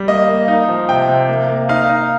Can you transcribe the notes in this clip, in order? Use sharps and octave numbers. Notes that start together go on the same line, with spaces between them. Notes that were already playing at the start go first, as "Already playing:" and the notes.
Already playing: G3
A#3 D#5
A#3
D#4
F3
C3 G5
C3
A#3
A#3
D#4 F5
D#4